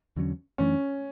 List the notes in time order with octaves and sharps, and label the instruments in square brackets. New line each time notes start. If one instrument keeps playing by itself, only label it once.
[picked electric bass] E2 D3 F#3 C#4
[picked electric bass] F#2 E3 A3 D4 [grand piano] C#4